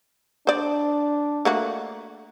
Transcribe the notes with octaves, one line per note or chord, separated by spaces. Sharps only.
D4 C5 D5
A3 A#3 F#4